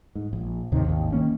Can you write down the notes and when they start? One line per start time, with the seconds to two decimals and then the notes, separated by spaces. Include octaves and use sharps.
0.15 G#2
0.33 A#1
0.72 D#2 A2 C3 D#3
0.86 G#1 D#2
1.12 D#3 A#3 C#4